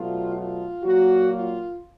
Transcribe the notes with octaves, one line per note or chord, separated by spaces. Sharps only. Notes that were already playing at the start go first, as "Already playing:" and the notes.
Already playing: B2 F#3 A3 F4
F4
A#2 F#3 A#3 F#4
F4